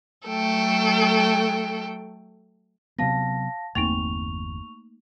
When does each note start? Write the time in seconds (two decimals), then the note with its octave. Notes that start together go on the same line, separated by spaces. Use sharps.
0.27 F#3 A3 A4 G5
2.99 C3 F#3 B3 F5 A5 A#6
3.75 G1 E2 A3 A#3 C4 D#4 C#6 F7